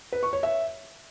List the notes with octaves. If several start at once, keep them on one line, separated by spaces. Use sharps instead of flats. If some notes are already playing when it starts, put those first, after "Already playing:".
B4
C#6
C#5
E5